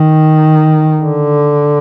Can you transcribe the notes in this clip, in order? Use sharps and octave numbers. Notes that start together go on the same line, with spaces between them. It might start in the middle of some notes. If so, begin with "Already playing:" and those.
Already playing: D#3
D3